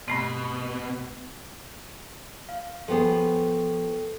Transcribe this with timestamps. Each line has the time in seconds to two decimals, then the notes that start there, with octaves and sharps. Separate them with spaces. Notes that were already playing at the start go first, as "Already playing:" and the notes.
0.08 G2 B2 A3 C4
2.49 F5
2.88 F3 B3 G#4 A4 G5 C#6